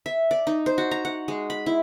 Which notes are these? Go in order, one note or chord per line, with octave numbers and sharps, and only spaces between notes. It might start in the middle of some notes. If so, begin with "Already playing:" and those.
E5
D5
D#4
C5
F#4
A#5
F#5
G#3
B5
E4